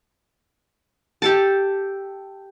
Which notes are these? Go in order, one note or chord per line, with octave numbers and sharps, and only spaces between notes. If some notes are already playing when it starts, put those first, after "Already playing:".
G4 A4 A5